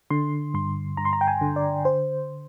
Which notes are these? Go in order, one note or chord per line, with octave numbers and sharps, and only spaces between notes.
D3 C6
G2 C6
G2 A#5
C6
A#5
G5
G#5
D3
D5
C5